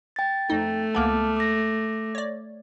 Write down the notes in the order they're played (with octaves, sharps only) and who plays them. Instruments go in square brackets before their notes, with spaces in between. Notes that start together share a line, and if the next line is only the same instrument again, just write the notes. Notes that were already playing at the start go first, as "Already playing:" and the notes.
[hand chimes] G5 A6
[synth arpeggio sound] F2 D#4 [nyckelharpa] A3
[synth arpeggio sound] C#2 A#3 B3 [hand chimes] A5 D6 F6
[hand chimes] D6 A#6
[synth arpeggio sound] C#5 D5